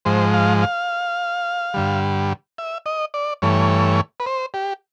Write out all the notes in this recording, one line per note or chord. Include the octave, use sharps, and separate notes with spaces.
G#2 F3 G#3 C5
F5
F5
G2 D3 G3
E5
D#5
D5
G2 E3 A3 C#5
B4
C5
G4